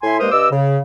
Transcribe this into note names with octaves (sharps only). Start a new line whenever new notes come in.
A2 E4 E5 G#5 C6
G2 G#3 A#3 A#4 C5 D#6
G2 D5 D#5 D6 E6
C#3